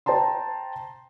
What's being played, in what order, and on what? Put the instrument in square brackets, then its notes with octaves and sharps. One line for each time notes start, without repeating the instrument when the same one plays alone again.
[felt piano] C5 G5 A5 A#5 C6